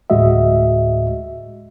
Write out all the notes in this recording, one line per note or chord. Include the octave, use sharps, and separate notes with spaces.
D2 A2 G#3 F#4 D#5 E5